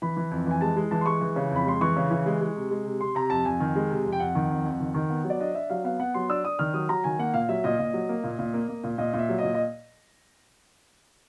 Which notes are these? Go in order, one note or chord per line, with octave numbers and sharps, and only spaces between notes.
E3 B5
E3
F2
E3 G#5
G#3 A5
G#3
E3 A5
C6
G#3 C#6
E3
C#3
F2 B5
G#3 C6
E3 C#6
C#3
E3
G#3
G#3
C3
G#3
C3
C3 C6
C3 A#5
F2 A5
F2 G#5
D#3
G#3
C3
F2
G5
F2 F#5
D#3
F2
F2
D#3
D#3
B3
F#3
D5
D4 D#5
D4 E5
F#3 F5
B3 F5
B3 F#5
F#3 C6
D4 E6
D4 D#6
D#3 F6
F#3 D#6
F#3 A#5
D#3 G#5
A#3 F#5
A#2 F5
F#3 E5
A#2 D#5
A#2
F#3
A#3
A#2
A#2
A#3
A#3
A#2
A#2 D#5
A#2
E5
F#3
A#2 D#5
D#5